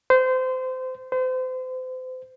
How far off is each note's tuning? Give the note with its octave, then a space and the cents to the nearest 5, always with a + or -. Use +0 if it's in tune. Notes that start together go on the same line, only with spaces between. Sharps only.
C5 -25
C5 -35